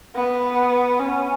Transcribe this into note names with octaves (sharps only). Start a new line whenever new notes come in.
B3
C#4